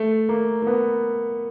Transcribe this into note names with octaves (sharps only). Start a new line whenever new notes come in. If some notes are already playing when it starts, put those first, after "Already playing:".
Already playing: A3
A#3
A#3
B3